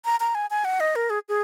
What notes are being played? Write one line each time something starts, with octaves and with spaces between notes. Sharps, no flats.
A#5
A#5
G#5
G#5
F#5
D#5
A#4
G#4
G#4